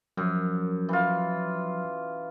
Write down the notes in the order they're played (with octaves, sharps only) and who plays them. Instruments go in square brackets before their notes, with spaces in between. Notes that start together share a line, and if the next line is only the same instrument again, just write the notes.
[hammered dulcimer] F#2 [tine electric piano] F3 F#3
[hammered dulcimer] E3 F4